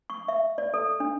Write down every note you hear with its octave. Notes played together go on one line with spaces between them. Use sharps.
C#6
E5
D5
A4
D4